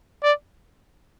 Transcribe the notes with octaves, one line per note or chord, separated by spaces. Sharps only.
D5